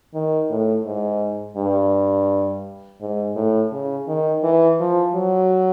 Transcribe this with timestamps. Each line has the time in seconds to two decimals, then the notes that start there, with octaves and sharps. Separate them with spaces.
0.14 D#3
0.50 A2
0.86 G#2
1.57 G2
3.01 G#2
3.36 A2
3.72 C#3
4.08 D#3
4.44 E3
4.80 F3
5.15 F#3